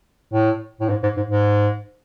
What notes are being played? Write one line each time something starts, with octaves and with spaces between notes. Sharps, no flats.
A2
A2
G#2
G#2
G#2
G#2